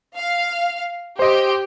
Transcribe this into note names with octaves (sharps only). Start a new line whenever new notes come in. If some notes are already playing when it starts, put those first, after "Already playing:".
F5
G4 C5 D#5